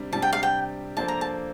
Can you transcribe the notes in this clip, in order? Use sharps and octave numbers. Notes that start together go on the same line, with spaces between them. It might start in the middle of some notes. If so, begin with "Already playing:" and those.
Already playing: C3 G3 D4
C3 G3 D4 A5
G5
F5
G5
F3 A#3 D4 A4 C5 A5
A#5
A5